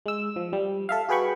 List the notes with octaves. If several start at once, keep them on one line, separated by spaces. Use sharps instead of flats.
G#3 E6
F3
G3
A4 E5 F5
F#4 G#4 B4 G5 B5 C#6